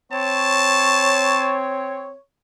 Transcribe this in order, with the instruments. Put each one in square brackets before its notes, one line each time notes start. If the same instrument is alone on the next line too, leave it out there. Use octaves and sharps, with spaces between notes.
[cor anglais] C4 [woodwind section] C#5 [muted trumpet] A5